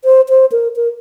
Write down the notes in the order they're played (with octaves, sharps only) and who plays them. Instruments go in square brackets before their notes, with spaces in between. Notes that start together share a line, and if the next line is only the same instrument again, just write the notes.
[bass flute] C5
C5
A#4
A#4